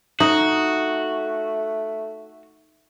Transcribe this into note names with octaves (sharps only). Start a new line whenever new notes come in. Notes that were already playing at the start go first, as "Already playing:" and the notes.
A3 D#4 F#4